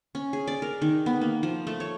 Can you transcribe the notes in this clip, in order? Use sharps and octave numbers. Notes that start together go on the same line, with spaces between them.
C#4
G#4
D5
A#4
D#3
B3
A#3
F3
A3
C#5